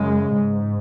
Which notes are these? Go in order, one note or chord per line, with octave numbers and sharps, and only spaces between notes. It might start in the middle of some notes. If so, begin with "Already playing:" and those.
Already playing: F#2 C#3 G#3
G#2